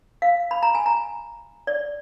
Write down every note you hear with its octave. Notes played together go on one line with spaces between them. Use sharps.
F5
B5
A#5
G#5
A#5
D5